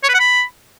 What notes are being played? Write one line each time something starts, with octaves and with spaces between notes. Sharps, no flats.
C#5
B4
F#5
B5